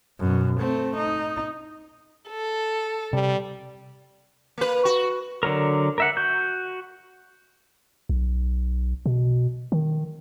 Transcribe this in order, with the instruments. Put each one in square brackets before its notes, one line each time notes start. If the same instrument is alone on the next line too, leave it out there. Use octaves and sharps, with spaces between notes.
[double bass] F#2 B2
A3 C4
D#4
[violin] A4
[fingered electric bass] C3 [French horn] G3
[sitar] A#3 B4
F#4
[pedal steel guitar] D3 F#3 A#4
A#4 E5 F#5
F#4 G6
[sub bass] B1
B2
D#3